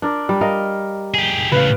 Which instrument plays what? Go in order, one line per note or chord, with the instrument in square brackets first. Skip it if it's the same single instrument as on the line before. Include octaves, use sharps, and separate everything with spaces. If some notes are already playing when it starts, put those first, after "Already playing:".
[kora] D4 A#4 D5
G3
A#4 D#5 F5
[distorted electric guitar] G4 G#4
[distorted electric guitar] A2 C#3 [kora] B4 F5